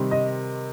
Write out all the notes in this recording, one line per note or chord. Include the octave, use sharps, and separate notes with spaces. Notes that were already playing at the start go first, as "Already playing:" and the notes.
Already playing: C3 D#3 G3 C4
D#5